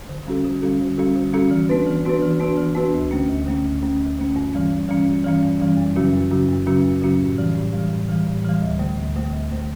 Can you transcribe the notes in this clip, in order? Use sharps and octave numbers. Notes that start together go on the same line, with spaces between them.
D3
G3 C#4 F#4 A4
D3
G3 C#4 F#4 A4
D3
G3 C#4 F#4 A4
D3
G3 C#4 F#4 A4
E3
B3 D4 F#4 B4
E3
B3 D4 F#4 B4
E3
B3 D4 F#4 B4
E3
B3 D4 F#4 B4
D2
D3 A3 C#4
D2
D3 A3 C#4
D2
D3 A3 C#4
D2
D3 A3 C#4
G2
E3 G3 C#4
G2
E3 G3 C#4
G2
E3 G3 C#4
G2
E3 G3 C#4
F#2
C#3 F#3 C#4 F#4
F#2
C#3 F#3 C#4 F#4
F#2
C#3 F#3 C#4 F#4
F#2
C#3 F#3 C#4 F#4
A2
E3 G3
A2
E3 G3
A2
E3 G3
A2
E3 G3
D2
D3 A3
D2
D3 A3
D2
D3 A3